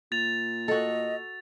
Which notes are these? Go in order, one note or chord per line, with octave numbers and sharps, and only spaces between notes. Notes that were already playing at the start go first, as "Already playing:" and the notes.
A#2 A6 F7
F#4 A4 D#5